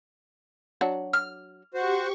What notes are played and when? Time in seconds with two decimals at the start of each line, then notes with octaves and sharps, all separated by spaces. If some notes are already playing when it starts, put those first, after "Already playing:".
0.81 F#3 D4 F#4
1.13 F6
1.74 F#4 G4 C5 C#6